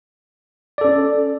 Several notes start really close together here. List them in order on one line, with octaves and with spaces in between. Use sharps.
D5 A4 C#4